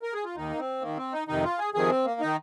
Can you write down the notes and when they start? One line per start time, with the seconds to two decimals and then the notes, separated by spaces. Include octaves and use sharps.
0.02 A#4
0.13 G#4
0.25 F4
0.36 D#2 D#3 D#4
0.50 A#3
0.59 C4
0.81 D#2 D#3 A#3
0.97 C4
1.13 D#4
1.28 F2 C3 D#3 D#4
1.44 F4
1.59 G#4
1.74 F2 C3 D#3 G#4
1.90 C4
2.05 A#3
2.20 D#3 D#4